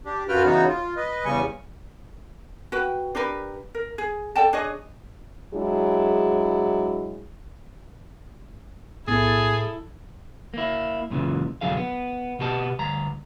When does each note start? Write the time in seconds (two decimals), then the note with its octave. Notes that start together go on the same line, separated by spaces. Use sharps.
0.05 D4 G4
0.29 F#2 F4 F#4 B4 G5 F6
0.45 C#3 E3 B3 D#4 F#4 C#5
0.67 F4
0.96 B4 D#5
1.25 E2 C#3 G3 G#5 C#6
2.72 F#4 B4 G5
3.15 D4 G4 A#4 B4
3.75 A#4
3.98 G#4
4.36 A4 D5 G5 A5
4.53 D4 G#4 C#5 D#5
5.53 F#3 G#3 D4 E4 G#4
9.08 B1 A2 B3 E4 G#4 A4 A6
10.54 A#3 E4
11.10 F#2 A#2 C#3 E3
11.61 B1 F#2 D3 F#3 G#4 F5
11.77 B3
12.39 B2 B3 G4 A5
12.79 D2 G2 A#5